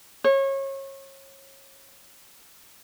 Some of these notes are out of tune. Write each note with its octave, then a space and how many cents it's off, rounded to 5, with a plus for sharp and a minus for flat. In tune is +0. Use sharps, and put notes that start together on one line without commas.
C#5 -30